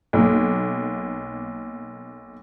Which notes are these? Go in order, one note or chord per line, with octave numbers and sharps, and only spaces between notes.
B1 A#3